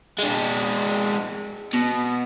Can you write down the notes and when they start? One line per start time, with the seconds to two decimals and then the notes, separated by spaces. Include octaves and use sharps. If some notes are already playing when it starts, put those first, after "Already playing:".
0.19 G#3 D4
1.74 B2